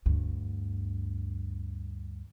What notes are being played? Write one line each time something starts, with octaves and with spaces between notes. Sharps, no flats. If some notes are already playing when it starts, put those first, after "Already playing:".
D2 G2